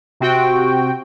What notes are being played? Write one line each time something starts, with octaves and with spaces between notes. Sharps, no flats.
C3 C4 F#4 G5